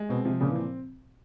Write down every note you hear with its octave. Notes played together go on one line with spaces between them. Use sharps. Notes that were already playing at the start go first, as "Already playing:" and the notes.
Already playing: G#3
B2 C4
C3 F3
A#2 C#3
E3
C4